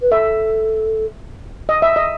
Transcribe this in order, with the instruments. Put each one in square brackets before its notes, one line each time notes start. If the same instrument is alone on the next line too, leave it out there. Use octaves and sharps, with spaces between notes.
[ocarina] B4
[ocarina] A4 [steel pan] E5
[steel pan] D#5
E5
D#5